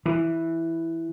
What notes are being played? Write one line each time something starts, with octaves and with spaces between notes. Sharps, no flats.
E3